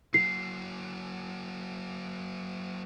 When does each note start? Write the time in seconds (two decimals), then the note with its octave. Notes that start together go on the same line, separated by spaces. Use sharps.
0.14 F#3 A#3 C7